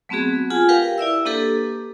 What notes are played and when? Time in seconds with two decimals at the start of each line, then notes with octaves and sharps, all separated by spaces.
0.09 F#3 A3 B3 C4 F#4 G#4
0.50 F4 G#4 F#5 G#5
0.69 G4 A#4 B4 F5 G5
0.98 E4 D5 E5 E6
1.25 A#3 D4 G4 A4 B4